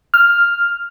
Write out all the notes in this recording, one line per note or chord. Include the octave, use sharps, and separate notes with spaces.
F6